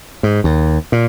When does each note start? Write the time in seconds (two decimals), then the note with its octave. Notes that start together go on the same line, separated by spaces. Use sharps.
0.23 G#2
0.44 D#2
0.92 A#2